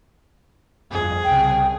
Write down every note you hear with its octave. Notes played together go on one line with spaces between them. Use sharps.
G1 F2 G#4
C2 C#3 G5